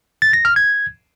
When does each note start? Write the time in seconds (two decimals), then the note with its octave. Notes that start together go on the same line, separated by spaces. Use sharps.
0.22 A6
0.33 A#6
0.45 F6
0.56 G#6